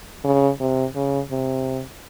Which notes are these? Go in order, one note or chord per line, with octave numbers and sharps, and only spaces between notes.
C#3
C3
C#3
C3